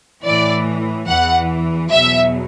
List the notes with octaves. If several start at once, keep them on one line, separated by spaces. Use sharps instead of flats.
A2 E3 D5
E2 E3 F#5
E2 B2 F#3 E5